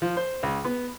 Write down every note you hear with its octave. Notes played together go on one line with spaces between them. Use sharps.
F3
C5
C#2
B3